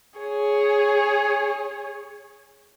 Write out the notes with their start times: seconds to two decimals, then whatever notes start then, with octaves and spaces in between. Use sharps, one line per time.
0.20 G#4 C#5